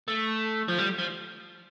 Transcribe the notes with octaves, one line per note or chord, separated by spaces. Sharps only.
A3
F3
G3
F3